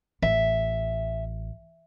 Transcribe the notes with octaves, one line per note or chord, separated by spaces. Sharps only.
A1 E5